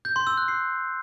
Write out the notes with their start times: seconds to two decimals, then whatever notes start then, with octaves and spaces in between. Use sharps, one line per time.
0.05 G6
0.16 C6
0.27 E6
0.37 F#6
0.48 C7